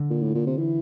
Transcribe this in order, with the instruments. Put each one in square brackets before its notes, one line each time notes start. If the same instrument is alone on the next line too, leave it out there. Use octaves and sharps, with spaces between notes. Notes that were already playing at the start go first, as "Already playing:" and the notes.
Already playing: [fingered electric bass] D3
[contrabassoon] A#2
A2
A#2
C3
E3